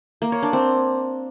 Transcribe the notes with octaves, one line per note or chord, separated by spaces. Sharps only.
A#3
C#5
D4
C4